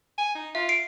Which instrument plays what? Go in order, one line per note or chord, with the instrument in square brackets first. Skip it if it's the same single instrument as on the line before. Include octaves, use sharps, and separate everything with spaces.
[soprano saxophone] G#5
D#4
[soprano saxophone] F4 [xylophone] E5
[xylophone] C7 D7